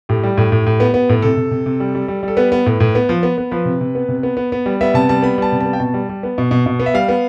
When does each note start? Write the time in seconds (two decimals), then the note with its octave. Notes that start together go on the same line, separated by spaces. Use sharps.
0.09 A2 G4
0.23 G3
0.37 A2
0.52 A2
0.66 A2
0.80 B3
0.94 B3
1.09 A2
1.22 C3 A4
1.37 C3
1.51 C3
1.66 C3
1.80 G3
1.95 G3
2.08 G3
2.23 G3
2.28 A4
2.37 B3 B4
2.52 B3
2.66 A2
2.80 A2
2.95 B3
3.09 F3
3.23 B3
3.38 B3
3.51 F3 B4
3.65 C3
3.81 C3
3.95 B3
4.09 C3
4.23 B3
4.37 B3
4.52 B3
4.66 G3
4.81 B3 E5
4.94 C3 A5
5.09 G3 A5
5.22 B3 B5
5.38 G3 A5
5.52 C3
5.60 B3 A5
5.73 G5
5.80 B2 A5
5.94 G3
6.09 G3
6.23 B3
6.38 B2
6.51 B2
6.66 B2
6.80 B3
6.86 E5
6.94 G3 F5
7.09 B3